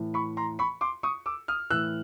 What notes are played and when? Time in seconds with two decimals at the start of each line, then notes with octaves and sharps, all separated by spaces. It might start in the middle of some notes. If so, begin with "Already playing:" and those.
Already playing: A2 E3
0.14 B5 C#6
0.37 A#5 C6
0.59 B5 C#6
0.81 C6 D6
1.03 C#6 D#6
1.26 D6 E6
1.48 D#6 F6
1.70 A2 E3 E6 F#6